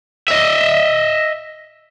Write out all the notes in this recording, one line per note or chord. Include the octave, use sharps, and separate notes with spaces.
D#5 E5